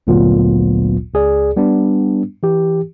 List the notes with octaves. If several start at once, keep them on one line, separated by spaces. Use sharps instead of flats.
G1 D2 A#2 F#3 B3 F4
C#2 G#4 D5
G3 B3 D4
E3 G4